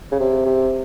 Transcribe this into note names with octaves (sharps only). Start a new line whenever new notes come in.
C#3
C3
C3